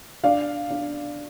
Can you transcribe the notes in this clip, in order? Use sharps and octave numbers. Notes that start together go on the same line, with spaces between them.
D4 D5 F5
D4